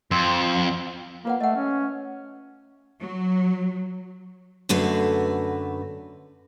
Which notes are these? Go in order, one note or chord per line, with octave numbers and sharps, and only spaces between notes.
F2 C4
A#3 F4 B4 F#5
A3 D#5 F#5
C#4
F#3
F#2 D3 A3 F#4 B4